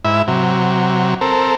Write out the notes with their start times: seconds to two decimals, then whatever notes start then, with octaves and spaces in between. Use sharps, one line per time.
0.05 G#2 E4 E5 B5
0.28 C3 F#3
1.21 C4 A4 A#4